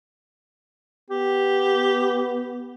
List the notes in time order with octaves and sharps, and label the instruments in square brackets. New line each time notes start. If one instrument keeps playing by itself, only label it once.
[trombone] B3 [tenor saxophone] G4